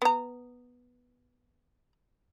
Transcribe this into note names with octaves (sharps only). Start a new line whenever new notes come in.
B3 A#5